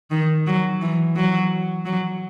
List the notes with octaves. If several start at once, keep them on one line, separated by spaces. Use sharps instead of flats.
D#3
F#3
E3
F#3
F#3